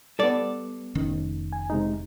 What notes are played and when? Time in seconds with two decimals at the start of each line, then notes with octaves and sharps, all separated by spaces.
0.19 G3 B3 A4 D5
0.95 F1 D#3 C#4
1.53 G#5
1.70 C3 G#3 D#4